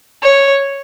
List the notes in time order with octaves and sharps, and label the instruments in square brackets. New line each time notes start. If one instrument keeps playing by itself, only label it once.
[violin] C#5